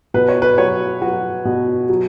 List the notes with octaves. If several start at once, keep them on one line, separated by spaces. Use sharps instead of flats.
B2 B4
C#5
B4
F#3 C#5
F#3 F#4
B2
F#3